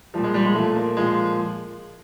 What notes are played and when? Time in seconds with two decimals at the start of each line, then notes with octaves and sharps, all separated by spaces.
0.14 A#2 F3 G3
0.24 G#3
0.34 G3
0.45 G#3
0.54 A#2 F3 A3
0.76 A#3
0.97 A#2 F3 G#3